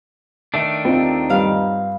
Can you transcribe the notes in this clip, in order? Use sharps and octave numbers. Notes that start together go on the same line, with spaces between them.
D#3 A3 D4 E5
D#2 C4 D#4 F4
G2 F5